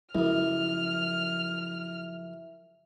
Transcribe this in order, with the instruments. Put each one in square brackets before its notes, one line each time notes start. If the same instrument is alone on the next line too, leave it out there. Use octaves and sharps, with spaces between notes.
[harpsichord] C#2 F#2 [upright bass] F3 [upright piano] E4 [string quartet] F6